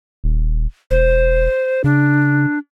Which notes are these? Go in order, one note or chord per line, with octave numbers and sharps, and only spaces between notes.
D#1
E1 C5
C#3 D4